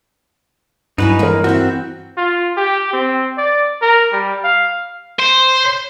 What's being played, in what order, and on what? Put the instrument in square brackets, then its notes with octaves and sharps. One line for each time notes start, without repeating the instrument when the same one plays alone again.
[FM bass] G2 [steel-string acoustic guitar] F#3 E4 G#5 [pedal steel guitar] D#4 B4
[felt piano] E3 A#4 [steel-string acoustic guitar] G#3 A#3
[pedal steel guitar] C4 F#4 [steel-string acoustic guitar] E4 E5
[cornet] F4
G4
C4
D5
A#4
G3
F5
[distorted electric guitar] C5